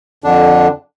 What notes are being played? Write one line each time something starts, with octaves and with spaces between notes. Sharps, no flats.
F2 D3 D4